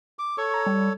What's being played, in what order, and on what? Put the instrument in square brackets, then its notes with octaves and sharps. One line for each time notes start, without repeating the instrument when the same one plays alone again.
[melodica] D6
[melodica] A4 C#5 [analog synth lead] C#6
[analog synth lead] A#5
G3